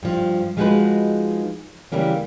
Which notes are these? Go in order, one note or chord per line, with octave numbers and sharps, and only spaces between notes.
G2 F3
F3 G#3 D#4 F#4 G#4 B4
C#3 E3 G3 A#3 C#4